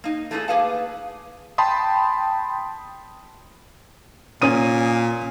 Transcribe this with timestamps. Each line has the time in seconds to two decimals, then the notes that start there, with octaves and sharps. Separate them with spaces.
0.04 A#3 D#4
0.31 A3 A#3 C#4 D#4 E4 G#4
0.48 A#3 G#4 B4 F5 A5
1.58 G5 A5 B5 C6 D#6
4.42 A#2 C#4 D#6 D#7